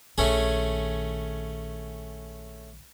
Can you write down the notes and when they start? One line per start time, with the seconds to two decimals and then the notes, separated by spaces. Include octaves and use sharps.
0.18 A#1 D#3 A3 C#4 G#4